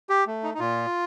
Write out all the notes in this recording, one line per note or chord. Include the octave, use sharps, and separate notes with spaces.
G4
A3
D#4
D#4
A#2 F4